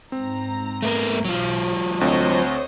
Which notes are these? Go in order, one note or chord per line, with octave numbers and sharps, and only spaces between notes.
G#2 C4 A#5
A3 B3 A#4
B1 F#3 F4
D2 C4 C5 C#5 D#5